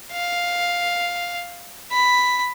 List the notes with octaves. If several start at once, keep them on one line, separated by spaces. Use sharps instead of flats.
F5
B5